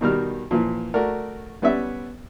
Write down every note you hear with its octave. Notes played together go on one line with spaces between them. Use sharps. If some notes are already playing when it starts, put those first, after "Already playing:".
B2 D#3 G3 F6
A#2 E3 F3
A3 F#4 A#4 D5
G3 B3 C#4 D5 E5